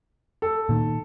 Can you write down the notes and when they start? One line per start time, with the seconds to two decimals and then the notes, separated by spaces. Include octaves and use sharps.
0.42 A4
0.69 A#2 D#3